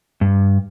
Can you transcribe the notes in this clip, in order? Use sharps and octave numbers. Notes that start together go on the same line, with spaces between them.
G2